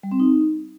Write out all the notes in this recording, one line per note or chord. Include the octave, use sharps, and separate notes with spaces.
G3
C4
D#4